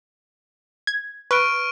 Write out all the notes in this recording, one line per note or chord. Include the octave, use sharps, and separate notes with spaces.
G#6
B4 C#6 F6 D7